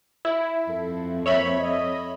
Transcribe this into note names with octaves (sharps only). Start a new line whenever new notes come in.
E4
F2 A4
A2 A#3 C5 C#5 E5 B5
A4 D#5